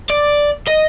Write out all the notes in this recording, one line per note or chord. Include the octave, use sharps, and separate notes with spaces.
D5
D#5